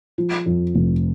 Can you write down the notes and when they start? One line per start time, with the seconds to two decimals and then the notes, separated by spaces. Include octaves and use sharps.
0.18 F3
0.46 F2
0.75 F1